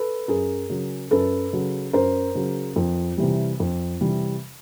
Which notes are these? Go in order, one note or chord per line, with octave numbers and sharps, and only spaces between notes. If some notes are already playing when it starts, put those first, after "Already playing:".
Already playing: A4 B4
F#2 G#4 A#4
C#3 F#3
F#2 A4 B4
C#3 F#3
F#2 A#4 C5
C#3 F#3
F2
C3 E3 G3
F2
C3 E3 G3